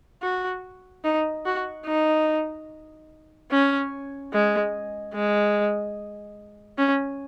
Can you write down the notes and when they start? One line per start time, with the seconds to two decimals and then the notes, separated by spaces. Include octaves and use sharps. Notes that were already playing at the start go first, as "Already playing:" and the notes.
0.22 F#4
1.04 D#4
1.46 F#4
1.86 D#4
3.51 C#4
4.33 G#3
5.14 G#3
6.78 C#4